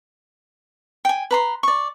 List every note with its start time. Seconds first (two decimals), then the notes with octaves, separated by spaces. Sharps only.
1.05 G5 G#5
1.31 B4 A#5 C6
1.63 D5 C#6